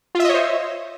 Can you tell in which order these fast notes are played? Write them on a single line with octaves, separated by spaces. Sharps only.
F4 E5 D#5 C#5 C5